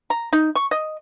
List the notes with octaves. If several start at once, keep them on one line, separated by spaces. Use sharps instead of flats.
A#5
D#4
C#6
D#5